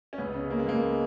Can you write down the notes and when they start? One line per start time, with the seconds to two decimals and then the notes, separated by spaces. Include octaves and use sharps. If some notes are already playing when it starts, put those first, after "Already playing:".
0.13 C#4
0.18 C#2 B3
0.34 C#3
0.50 C#3 A#3
0.59 G#3
0.66 C#2 A#3